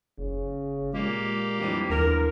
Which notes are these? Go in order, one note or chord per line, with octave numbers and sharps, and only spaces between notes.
F#1 C#3
A#2 G#3 A#3 G4
F2 D3 E3 G3
D#2 D3 E3 A#4